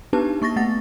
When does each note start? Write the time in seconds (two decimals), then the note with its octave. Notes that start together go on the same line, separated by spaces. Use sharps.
0.13 B3 D4 D#4 G4 B4 A5
0.42 A#3 C#6 A6 A#6
0.56 A3 B3 F#5 A6